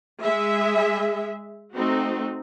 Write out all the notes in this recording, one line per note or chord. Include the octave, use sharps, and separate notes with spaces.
G#3 G#4 E5
A3 C4 D#4 F#4